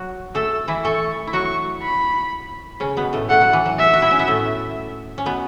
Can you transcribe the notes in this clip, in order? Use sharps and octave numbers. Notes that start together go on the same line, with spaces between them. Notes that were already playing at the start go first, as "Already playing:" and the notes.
Already playing: F#3 F#4
A3 A4 E6
E3 E4
A3 A4 C#6
E4
F#3 F#4 C#6
B5
C#3 C#4
B2 B3
A2 A3
A3 F#5
F#3
E3
F#3
E5
F#4
E4
C#4
B3
A2 A3
C#4
B2 B3